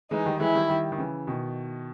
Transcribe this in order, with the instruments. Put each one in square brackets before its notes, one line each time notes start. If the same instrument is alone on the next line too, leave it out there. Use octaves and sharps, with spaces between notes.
[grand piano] E3 G#3 [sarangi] D#4
[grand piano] D#3 G3
[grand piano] E3 G#3 [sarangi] E4
[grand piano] D#3 G3
D#3 G3
D#3
C#3 E3
B2 D#3